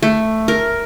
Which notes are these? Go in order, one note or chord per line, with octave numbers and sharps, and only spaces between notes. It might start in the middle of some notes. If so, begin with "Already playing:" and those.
A3
A#4